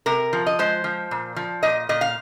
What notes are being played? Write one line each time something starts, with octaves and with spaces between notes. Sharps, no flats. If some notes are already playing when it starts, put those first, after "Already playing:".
C3 A#4
F3
D#5
G#3 C5
F3
A#2
F3
A#2 D#5
A#2 D#5
F5